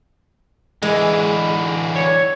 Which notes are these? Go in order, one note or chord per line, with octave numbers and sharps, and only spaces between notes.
D3 E3 G#3
C#5